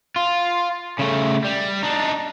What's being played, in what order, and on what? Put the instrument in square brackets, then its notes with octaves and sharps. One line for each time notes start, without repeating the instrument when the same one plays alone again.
[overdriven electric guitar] F4
C#3 A3
G3
D4 D#4